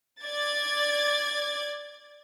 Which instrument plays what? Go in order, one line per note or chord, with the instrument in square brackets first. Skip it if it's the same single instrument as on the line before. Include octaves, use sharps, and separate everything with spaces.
[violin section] D5 G#6 A6